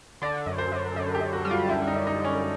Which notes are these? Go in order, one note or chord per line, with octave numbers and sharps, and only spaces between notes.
D3 D5
F#2
C5
F#2
F#2
G4
F#2
F#4
G3
F4
D3 E4
D#4
F#2
D#4
F#2
C#4